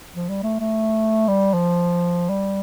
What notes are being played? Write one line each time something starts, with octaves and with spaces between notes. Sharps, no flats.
F3
G3
A3
A3
G3
F3
G3